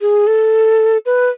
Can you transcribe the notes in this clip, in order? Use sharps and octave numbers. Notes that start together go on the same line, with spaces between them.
G#4
A4
B4